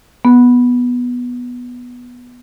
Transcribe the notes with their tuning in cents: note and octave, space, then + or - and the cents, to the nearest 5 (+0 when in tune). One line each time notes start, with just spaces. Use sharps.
B3 -10